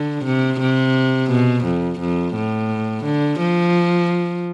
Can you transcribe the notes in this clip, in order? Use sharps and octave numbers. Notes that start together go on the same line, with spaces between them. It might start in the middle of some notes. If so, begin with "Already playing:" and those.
Already playing: D3
C3
C3
B2
F2
F2
A2
D3
F3